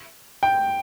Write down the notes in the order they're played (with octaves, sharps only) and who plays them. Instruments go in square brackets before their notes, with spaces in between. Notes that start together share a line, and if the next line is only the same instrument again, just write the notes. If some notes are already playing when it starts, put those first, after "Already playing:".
[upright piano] G5